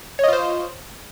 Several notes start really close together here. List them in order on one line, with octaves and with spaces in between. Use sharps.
C#5 D#5 F4 C5